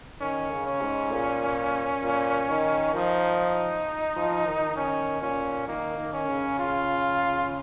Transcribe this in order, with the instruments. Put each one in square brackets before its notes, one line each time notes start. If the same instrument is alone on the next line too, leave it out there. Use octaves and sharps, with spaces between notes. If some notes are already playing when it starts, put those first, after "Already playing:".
[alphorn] D#3 [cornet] C#4
[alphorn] C#3
[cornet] C#4
[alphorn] G#2
A#2
A#2
D#3
[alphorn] F3 [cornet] D#4
[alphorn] F3
D#3
[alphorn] D#3 [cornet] C#4
[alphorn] A#2 [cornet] C#4
[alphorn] D#3 [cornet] A#3
[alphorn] D#3
[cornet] C#4
[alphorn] C#3
[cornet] F4